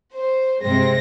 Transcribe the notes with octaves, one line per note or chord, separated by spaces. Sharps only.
C5
G2 C3 G#3 C4 A#6